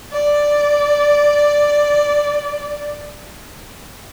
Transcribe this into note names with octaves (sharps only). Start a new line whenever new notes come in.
D5